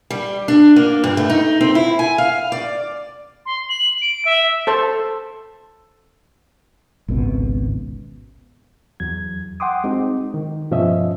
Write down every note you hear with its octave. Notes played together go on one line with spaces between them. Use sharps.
G3
D4
A#3
G2
A3
D#4
C4
E4
G#5
F5
D5
C6
F#7
D7
E5
A4 C5 A5
G#1 C#2 B2
E2 F#3 G#6
F#5 G5 C6 D6 D#6
G#3 C4 D#4 F#4
D#3
G2 B2 F3 C#4 D#5 E5